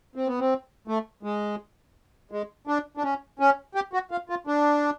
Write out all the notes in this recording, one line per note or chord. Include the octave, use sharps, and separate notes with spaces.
C4
B3
C4
A3
G#3
G#3
D4
D4
C#4
C#4
G4
F#4
F4
F4
D4